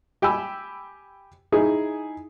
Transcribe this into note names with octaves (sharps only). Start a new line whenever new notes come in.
G4 G5 G#5 B5 E6
D#4 E4 G#4